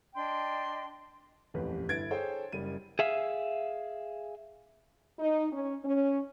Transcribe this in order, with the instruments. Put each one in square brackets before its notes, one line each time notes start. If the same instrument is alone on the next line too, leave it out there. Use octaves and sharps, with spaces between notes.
[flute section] D4 D#5 G5 C6
[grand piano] D#1 A1 F2 G4 B4
G1 E4 B4 G#6 A6 D7
G#4 A4 C5 C#5 G5
F#1 G3 D#7
[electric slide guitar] G#4 E5 F5
[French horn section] D#4
C#4
C#4